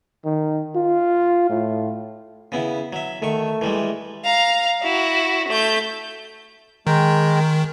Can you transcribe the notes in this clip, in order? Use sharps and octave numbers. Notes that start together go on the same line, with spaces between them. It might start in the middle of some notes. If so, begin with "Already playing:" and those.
D#3
F4
A2
C#3 B3 E4
F#3 E5
D#3 A3 C#6
E3 G3 G#3
F5 A#5
E4 F#4
A3 G6
D#3 G#3 G5 A#5